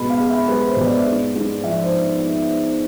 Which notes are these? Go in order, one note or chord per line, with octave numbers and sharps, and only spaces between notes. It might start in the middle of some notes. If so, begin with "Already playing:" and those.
Already playing: B2 G#3 B5
F5
G#3
E5
G#3 B4
C5
B2
D5
G#2
G#2
F3 E5
C5